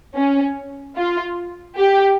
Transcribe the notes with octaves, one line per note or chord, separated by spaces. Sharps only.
C#4
F4
G4